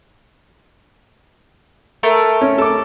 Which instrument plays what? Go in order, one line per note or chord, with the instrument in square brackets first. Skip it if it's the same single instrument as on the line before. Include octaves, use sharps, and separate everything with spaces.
[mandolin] A3 A#4 A5
[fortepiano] C#4
A4 D6